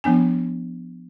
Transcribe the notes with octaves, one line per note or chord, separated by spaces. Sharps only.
F3 B3 D4 G#5